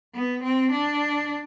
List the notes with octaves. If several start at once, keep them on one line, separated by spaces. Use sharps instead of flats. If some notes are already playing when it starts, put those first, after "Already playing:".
B3
C4
D4